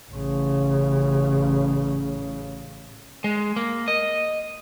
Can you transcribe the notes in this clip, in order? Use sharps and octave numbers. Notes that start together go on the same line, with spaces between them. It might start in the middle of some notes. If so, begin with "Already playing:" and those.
A1 C#3
G#3
A#3
D#5